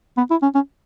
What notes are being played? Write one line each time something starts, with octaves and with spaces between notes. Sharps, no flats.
B3
E4
C#4
C#4